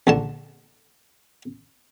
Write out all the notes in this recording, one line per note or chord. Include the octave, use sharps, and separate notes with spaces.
A#1 D3 A5